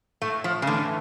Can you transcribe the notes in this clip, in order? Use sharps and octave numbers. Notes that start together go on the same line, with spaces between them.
A2 A3
F3
C#3
D3 E3 A3